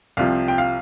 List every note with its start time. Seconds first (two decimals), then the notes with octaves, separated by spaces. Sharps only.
0.17 C2 C3 F3 F5
0.48 G5
0.58 F5